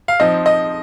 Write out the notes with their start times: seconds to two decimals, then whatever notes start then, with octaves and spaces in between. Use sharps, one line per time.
0.08 F5
0.20 F3 C4 D#4 D#5
0.46 D#5